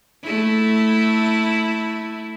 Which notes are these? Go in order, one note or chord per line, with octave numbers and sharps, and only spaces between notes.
A3 E4